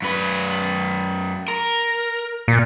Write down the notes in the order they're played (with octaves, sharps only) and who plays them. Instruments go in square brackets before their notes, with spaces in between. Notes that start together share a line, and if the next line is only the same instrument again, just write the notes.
[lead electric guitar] F#2 B4
A#4
[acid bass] A#2